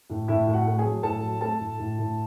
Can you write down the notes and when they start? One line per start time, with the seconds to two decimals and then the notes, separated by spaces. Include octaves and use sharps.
0.10 A2
0.28 A2 E4 E5
0.47 A2
0.53 F#4 F#5
0.66 A3
0.79 G#4 G#5
0.85 F#3
1.03 A2 A4 A5
1.23 F#3
1.41 A3 A4 A5
1.60 A2
1.79 A2
1.98 A2